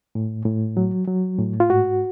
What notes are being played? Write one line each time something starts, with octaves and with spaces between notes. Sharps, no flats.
A2
A2
F#3
F#3
A2
F4
G#2 F#4